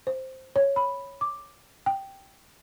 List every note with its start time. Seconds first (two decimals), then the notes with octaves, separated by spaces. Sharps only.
0.07 C5
0.56 C#5
0.76 B5
1.21 D6
1.86 G5